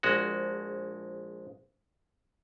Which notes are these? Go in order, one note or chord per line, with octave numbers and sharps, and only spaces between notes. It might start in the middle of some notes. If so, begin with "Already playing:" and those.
A#1 G#3 F#4